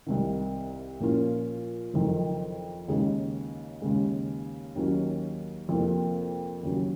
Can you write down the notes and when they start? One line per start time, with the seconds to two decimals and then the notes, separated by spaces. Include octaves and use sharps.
0.07 C2 C3 D#3
1.00 A#2 F3 A#3 C#4 F4
1.94 F#1 F2 D#3
2.88 D#2 C#3 G#3 D#4 G#4
3.82 D#2 C#3 G#3
4.75 D#2 D#3 F#3 C#4
5.69 F2 C3 F3 A#3 F4
6.63 D#2 C#3 F#3